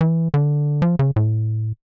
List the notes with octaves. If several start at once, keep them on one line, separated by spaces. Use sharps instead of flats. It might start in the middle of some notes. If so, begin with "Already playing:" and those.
E3
D3
F3
C#3
A2